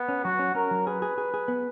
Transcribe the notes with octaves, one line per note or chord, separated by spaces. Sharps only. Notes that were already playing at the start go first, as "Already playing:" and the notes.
Already playing: B3
C#4
F#3 F#4
C#4
C#4 A#4
F#3
G#4 B4
G#4
G#4
G#4
B3